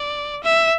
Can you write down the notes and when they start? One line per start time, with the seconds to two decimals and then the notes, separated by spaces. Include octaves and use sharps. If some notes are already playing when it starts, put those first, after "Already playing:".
Already playing: D5
0.44 E5